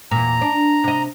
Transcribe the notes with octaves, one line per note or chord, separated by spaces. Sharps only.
E2 A#2 A#5
D4
C3 D#5